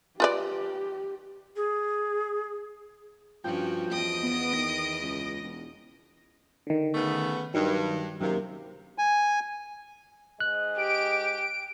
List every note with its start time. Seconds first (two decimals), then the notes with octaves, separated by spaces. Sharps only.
0.20 F4 G4 B4 D5
1.56 G#4
3.44 G2 F3 C#4 F#4 G5
3.92 E2 D#5 D#6 D7
4.23 B3
4.53 D#3 A#6
5.01 C#2
5.43 E1
6.67 D3 D#3
6.95 C#3 A3 B3
7.54 G2 D#3 F#3
8.21 F#2 C3 D#3 A#3
8.98 G#5
10.40 G#2 G#3 D#5 F#6
10.78 G4 D7